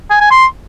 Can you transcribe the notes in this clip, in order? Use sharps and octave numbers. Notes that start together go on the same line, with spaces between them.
G#5
G#5
C6